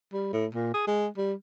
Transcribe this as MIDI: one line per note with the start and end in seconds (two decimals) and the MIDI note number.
0.13 0.28 55
0.33 0.46 45
0.54 0.74 46
0.74 0.87 68
0.87 1.07 56
1.17 1.33 55